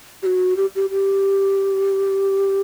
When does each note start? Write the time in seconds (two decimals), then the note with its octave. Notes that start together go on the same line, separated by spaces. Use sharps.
0.23 G4
0.26 F#4
0.57 G4
0.75 G4
0.90 G4